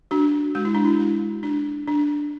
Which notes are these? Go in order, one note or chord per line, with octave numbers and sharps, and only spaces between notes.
D4 F#4
G#3 F#4
E4
D4
E4
G#3 F#4
D4
D4